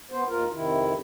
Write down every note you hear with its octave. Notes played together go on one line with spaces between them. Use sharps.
B3 C5
D#2 F4 A#4
F2 C3 D#3 E4